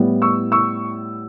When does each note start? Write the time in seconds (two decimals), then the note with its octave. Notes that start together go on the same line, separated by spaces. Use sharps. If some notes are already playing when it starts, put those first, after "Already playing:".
Already playing: A2 G3 B3 E4
0.22 C#6 E6
0.52 C#6 E6